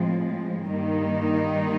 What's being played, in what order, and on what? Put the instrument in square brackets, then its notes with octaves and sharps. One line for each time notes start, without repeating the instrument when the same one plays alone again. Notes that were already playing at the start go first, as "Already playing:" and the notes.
Already playing: [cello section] A2 F3 G#3 C4
G2 D#3 G3 A#3 D#4